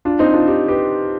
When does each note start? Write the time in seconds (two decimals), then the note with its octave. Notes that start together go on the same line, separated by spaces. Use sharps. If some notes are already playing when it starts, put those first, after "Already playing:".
0.05 D4 F4
0.19 C4 D#4
0.33 D4 F4
0.47 D#4 G4
0.68 G4 B4